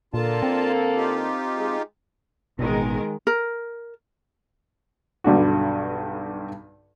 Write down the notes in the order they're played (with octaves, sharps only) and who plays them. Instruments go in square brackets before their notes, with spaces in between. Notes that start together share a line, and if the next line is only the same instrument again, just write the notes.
[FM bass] A#2 [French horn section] D3 A#3 A4 [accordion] F4 A5
[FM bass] C4
[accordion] D#4 F4 G4
[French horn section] G#3 G#4
[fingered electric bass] A1 B2 [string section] D#3 G#3 A#4
[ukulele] A#4
[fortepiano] B1 G2 D3 F#4